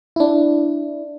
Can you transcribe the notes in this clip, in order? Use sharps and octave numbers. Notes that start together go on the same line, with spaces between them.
D4 E4